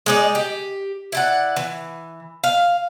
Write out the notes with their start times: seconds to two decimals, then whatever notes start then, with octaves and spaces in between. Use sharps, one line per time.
0.06 G#3 D#4 D5
0.35 G4
1.12 E4 D5 F#5
1.56 E3
2.44 F5